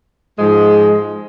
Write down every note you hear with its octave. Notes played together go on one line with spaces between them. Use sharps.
G#2 F3 G#3